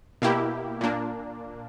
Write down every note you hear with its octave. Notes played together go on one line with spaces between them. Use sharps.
B2 A#3 E4 G4
A#2 A#3 D4